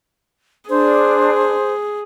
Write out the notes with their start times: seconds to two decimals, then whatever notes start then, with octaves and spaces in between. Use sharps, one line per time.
0.70 D4 G#4 C5